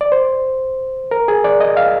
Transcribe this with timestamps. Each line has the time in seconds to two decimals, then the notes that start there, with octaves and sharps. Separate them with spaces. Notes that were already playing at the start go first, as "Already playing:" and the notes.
0.01 D5
0.12 C5
1.11 A#4
1.28 G#4
1.44 D5
1.60 D#5
1.77 F5